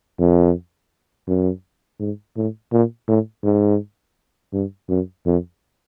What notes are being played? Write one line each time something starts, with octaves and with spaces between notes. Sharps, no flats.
F2
F#2
G#2
A2
A#2
A2
G#2
G2
F#2
F2